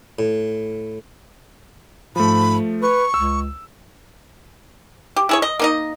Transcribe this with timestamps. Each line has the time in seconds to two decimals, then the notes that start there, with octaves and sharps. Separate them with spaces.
0.19 A2
2.16 G#2 F3 A3 B5
2.83 B4 C#6
3.14 C#2 E6
5.16 G4
5.29 E4 G#4 C#5
5.42 D#5
5.59 A#3 D#4 D#5